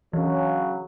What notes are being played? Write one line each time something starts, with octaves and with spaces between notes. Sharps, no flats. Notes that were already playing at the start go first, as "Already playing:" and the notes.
C#3 E3 F#3